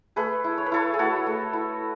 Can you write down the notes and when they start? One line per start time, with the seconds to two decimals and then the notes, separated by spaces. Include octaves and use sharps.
0.16 A3 G#4 B4
0.44 E4
0.58 C#5
0.66 B4
0.72 E4 A4 C#5
0.94 G#4
0.99 A3 F#4 A4
1.26 A3
1.53 E4